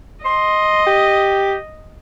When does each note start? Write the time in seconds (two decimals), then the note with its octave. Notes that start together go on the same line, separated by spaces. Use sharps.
0.25 D#5 C6
0.87 G4